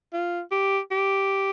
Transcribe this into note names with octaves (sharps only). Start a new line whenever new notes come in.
F4
G4
G4